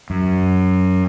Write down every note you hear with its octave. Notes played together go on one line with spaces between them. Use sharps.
F#2